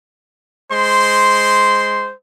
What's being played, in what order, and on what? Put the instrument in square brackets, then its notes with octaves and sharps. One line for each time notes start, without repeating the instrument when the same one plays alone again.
[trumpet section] G#3 C5 C6